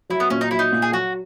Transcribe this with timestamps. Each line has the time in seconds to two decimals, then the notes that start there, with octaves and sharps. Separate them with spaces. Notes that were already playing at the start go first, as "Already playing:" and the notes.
0.09 F#3 E4
0.20 B3
0.30 A#2 C#4
0.41 D#4
0.51 F#3 E4
0.59 D#4
0.72 A#2
0.82 G#4
0.93 F#3 F#4